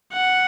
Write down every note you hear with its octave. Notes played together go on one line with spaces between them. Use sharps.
F#5